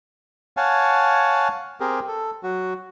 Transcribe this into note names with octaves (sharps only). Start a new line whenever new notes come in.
C#5 F5 F#5 G#5 A5
C4 G4 G#4 A#4
A4
F#3 F#4